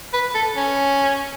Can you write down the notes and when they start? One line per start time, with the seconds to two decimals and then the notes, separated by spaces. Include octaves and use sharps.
0.13 B4
0.34 A4
0.56 C#4